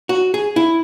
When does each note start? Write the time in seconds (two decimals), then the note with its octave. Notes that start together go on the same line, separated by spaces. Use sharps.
0.09 F#4
0.34 G#4
0.56 E4